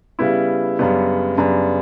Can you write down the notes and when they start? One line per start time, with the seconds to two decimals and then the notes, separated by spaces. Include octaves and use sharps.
0.19 C#3 G3 B3 E4
0.79 F#2 C#3 G3 B3 D4
1.38 F#2 C#3 G3 B3 D4